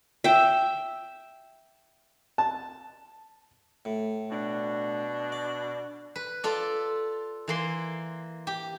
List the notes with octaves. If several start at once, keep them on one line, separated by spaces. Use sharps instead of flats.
E5 G5
A5
A2
B2 D4
D5
B4
F4 A4 D5
E3 A#3 C6
G4